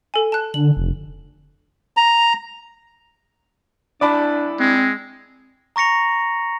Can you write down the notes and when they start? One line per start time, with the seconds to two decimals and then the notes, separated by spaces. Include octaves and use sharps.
0.14 A4 G#5
0.32 A5 F#6
0.54 D3 F#7
0.77 F1
1.97 A#5
4.01 G2 D4 E4 D5 A5 B5 D6
4.60 G#3 C4
5.76 A#5 C#6 A#6 C#7 F7